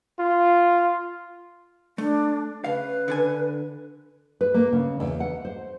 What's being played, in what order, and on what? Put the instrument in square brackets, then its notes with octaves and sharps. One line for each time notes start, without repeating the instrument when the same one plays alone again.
[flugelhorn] F4
[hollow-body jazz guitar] A3 [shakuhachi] D4
[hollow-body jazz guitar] C#3 F5 [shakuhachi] B4
[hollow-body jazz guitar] D3 D4 G#5
[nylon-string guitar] B4
A#3
C#3
E2
F#5
C5